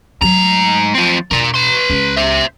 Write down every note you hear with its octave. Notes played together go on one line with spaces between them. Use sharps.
G#2 F#3 A3 A#5
F3 C4
E1 A#4 D5
B4 C6
C#2 A#3
C5 E5